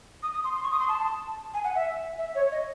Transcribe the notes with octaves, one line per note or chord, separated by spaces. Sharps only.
D#6
D#6
C6
C6
C#6
D#6
C6
A5
G#5
F#5
E5
E5
C#5
D#5